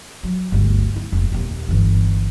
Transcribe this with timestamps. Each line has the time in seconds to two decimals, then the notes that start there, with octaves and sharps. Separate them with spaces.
0.23 F#3
0.52 G1 D2
0.96 E4
1.12 F1
1.32 D#1 D#2
1.69 G1 E3